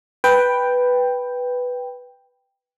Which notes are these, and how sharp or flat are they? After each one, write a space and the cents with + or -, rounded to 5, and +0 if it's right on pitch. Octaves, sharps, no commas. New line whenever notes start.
B4 +0 G5 +5